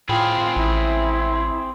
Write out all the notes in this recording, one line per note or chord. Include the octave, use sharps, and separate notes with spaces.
A2 C4 F4 G#4 G5 B5
A1 E4